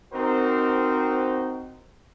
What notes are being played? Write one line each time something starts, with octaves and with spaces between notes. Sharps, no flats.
C4 D#4 F#4 A#4 C5